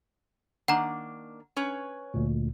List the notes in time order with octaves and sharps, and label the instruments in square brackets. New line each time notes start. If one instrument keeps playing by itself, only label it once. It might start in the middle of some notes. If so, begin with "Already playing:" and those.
[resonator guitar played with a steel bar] D#3 A#3 D4 [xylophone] F#5 A#5
[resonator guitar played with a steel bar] C#4 B4 C#5
[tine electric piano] D2 A#2